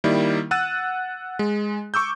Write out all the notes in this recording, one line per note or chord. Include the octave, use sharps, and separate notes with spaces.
D#3 G3 A#3 E4
F#5 E6 F#6 A6 D#7
G#3
C#6 D6 E6 G6